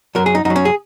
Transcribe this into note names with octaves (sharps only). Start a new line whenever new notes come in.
F#2 F#3 A#4
G#4
D#4
F#2 F#3 D#4
C#4
G#4